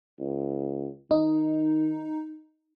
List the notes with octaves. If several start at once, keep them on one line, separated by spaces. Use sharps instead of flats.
C#2
D#3 D#4